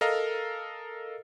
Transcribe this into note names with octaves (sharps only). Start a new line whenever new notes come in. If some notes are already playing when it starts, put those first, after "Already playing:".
A4 A#4 D#5 F5 A#5